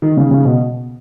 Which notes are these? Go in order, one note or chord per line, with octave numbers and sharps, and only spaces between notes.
D#3
C#3
C#3
B2